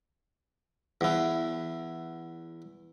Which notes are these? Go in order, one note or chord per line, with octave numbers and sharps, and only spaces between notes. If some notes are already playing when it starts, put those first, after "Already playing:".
E2 E3